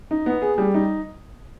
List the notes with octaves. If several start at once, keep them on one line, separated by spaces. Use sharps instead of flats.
D#4
B3
G#4
G3
D#4